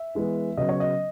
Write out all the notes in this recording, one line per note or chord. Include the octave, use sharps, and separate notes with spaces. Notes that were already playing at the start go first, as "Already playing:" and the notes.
Already playing: E5
E3 G#3 B3
C#3 F#3 B3 D#5
C#5
D#5